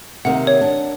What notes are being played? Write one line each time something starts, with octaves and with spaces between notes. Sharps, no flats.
C3 D#3 A#3 F#5
C#5
D4